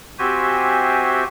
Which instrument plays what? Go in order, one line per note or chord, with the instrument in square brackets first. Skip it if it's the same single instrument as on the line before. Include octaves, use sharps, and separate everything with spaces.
[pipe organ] C4 F#4 G4 C5 E5 G#5